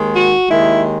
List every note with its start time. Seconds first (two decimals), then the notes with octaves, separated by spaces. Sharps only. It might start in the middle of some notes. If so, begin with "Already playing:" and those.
Already playing: D#2 D#3 G#3
0.15 F#4
0.49 D#2 D#3 G#3 E4